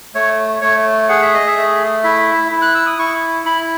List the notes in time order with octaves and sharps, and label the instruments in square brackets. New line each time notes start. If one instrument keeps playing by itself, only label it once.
[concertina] A3 C#5
A3 C#5
G#4 F#5
E5
D#5
E5
A3
E4 E5
E4
F#6
E6
D#6
E4 C#6
E4 B5